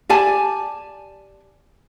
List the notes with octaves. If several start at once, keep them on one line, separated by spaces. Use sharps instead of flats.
G4 D5 G#5 A5